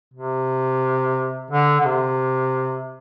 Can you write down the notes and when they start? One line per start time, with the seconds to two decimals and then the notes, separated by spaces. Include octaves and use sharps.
0.14 C3
1.51 D3
1.81 D3
1.86 C3